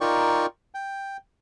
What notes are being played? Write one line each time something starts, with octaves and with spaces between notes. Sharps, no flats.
D#4 F4 A#4 D5 G5 C#6
G5